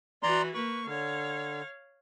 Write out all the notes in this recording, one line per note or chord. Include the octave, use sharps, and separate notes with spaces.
E3 F#4 D5 A#5 C6
A#3 B4 C#6
D3 C#5 F5